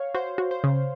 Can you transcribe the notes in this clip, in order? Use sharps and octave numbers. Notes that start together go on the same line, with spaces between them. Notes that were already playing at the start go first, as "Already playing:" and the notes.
Already playing: C#5 F5
F#4 C5
F#4
C5
C#3